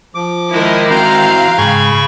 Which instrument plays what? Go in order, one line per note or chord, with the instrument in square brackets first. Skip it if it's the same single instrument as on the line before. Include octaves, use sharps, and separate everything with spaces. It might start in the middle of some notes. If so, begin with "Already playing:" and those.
[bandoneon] F3 D6
[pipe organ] D#3 G#3 [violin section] E4 A#4 D#5
[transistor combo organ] E3 C4 F#4 [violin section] F5 [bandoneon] G5 A#5 G6
[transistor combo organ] G#2 G#5 [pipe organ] C#3 B5 C#6